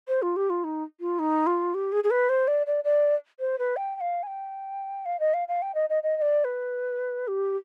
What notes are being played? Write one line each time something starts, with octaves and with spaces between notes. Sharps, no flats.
C5
F4
G4
F4
D#4
F4
D#4
F4
G4
G#4
G#4
B4
C5
D5
D5
D5
C5
B4
G5
G5
F5
G#5
G5
F5
D#5
F5
F5
G5
D#5
D#5
D#5
D#5
D5
B4
G4